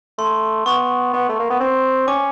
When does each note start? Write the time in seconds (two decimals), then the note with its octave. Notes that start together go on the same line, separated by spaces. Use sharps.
0.18 A3 C6
0.66 B3 C#6
1.14 B3
1.29 A3
1.40 A#3
1.50 B3
1.60 C4
2.08 C#4 D6